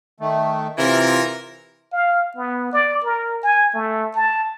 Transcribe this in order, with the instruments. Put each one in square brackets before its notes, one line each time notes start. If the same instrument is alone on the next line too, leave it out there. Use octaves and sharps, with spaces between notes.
[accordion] D#3 A3
[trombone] C3 [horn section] E3 A#4 [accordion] F4
[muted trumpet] F5
B3
D5
A#4
G#5
A3
A5